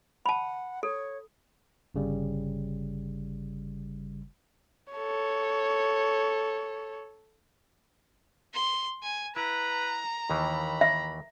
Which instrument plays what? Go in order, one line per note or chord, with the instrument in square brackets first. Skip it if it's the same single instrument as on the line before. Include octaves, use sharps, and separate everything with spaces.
[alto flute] F#5 [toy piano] A5 B5
[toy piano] A4 [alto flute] C#5
[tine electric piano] G1 C#3 G3
[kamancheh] A4 C#5
[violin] C6
G#5
[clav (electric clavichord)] E4 [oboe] B4 [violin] A#5
[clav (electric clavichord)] D#2 D#3 E3 [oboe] B5
[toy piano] E5